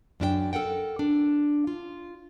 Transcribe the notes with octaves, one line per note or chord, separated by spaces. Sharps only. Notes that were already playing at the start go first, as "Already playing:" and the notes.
F#2 D4 E4 G5
A4 A#4 F#5 G5
D4
F4